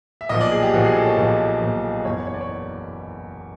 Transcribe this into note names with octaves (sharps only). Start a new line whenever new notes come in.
E5
B1 A#2 F3 D#5
D5
G#4
G4
B1 A#2 F3 F#4
G#4
A4
C#5
B1 A#2 F3
B1 A#2 F3
F#1 E2 B2 C#5
C#5
D5
C#5